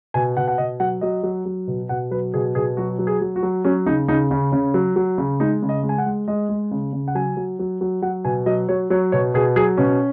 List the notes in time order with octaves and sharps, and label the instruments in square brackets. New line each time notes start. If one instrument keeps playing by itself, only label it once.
[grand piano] B2 G#5
B2 F#5
F#5
B2 D#5
F#3 F#5
F#3 D#5
F#3
F#3
B2
B2 F#5
F#3 B4
B2 G#4
B2 G#4
F#3 F#4
F#3
G#4
F#3
F#4
F#3
F#3 C#4
C#3 D#4
C#3 D#4
C#3
C#3 C#4
F#3
F#3
C#3
G#3 D#4
C#3
D#5
G#3
G#5
F#5
G#3
G#3 D#5
G#3
C#3
C#3
F#5
F#3 G#5
F#3
F#3
F#3
F#3 F#5
B2 G#5
F#3 D#5
F#3 C#5
F#3 C#5
B2 C#5
B2 G#4
F#3 G#4
B2 C#4